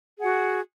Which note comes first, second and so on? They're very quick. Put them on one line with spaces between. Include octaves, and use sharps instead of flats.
G#4 F#5 F#4